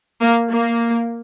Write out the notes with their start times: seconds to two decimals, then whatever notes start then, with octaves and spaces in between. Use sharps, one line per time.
0.22 A#3
0.49 A#3